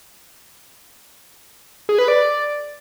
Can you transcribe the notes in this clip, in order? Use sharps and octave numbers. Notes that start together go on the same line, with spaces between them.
G#4
B4
D5